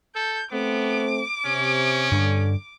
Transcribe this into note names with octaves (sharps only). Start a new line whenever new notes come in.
A4 G6
A3 B3 C4 D6
C3 C#4
G2 D3 D4